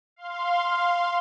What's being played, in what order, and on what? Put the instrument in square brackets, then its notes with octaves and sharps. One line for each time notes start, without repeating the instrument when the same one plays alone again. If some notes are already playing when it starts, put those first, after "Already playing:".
[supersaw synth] F5 C6